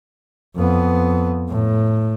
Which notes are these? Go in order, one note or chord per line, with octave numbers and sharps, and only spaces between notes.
F2 B3
A2